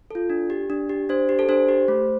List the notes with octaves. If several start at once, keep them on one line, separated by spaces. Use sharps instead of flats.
F4 A4
D4
G4
D4
G4
D4 C5
G4
A4
D4 C5
G4
A3